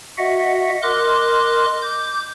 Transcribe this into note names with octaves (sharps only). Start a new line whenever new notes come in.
F#4 D#5 E5 F#5
A#4 D#5 C6 D6 F#6
D6 G6